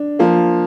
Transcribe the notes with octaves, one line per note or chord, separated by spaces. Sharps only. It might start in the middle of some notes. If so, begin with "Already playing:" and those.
Already playing: D4
F3 A#3